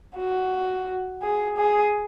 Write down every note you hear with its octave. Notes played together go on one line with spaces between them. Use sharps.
F#4
G#4
G#4